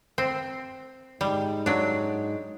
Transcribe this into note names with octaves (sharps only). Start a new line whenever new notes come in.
C4
G#2 G3 G#3 D#4
F#3 D4